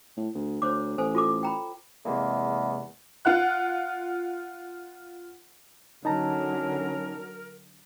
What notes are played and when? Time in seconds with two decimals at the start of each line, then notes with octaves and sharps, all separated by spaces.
0.17 A2
0.35 D2
0.62 D2 C5 C#5 D6
0.98 A1 A4 C5 G#5
1.15 F4 A4 D6
1.43 G5 A#5 B5
2.05 E2 C3 G#3 A#3
3.25 F4 F#5 F#6
6.05 D3 F#3 C#4 D#4 A#4 A5 A#5